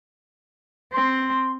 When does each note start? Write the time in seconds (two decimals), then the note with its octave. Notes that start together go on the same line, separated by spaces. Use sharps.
0.94 C4 C6